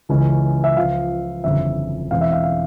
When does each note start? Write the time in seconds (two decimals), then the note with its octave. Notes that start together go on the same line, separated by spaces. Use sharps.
0.09 C#2 C#3 E3 G#3 C#4
0.64 E5
0.77 C#2 C#3 F3 F5
1.44 G1 F2 C#3 E3 E5
2.11 E1 E2 E3 G#3 C4 F5
2.21 E5
2.32 F5
2.43 F5